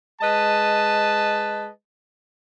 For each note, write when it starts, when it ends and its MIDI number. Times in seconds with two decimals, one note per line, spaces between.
0.21 1.68 56
0.21 1.68 71
0.21 1.68 75
0.21 1.68 81